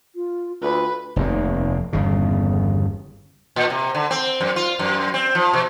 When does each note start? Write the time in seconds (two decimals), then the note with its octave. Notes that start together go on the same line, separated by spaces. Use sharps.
0.15 F4
0.62 D2 F4 B4
1.16 F1 D#2 C3
1.93 G1 E2 C#3
3.56 A#2
3.70 C3
3.95 D3
4.11 C4
4.41 F#2
4.56 F4
4.79 F#2
5.14 C4
5.35 F3
5.53 B2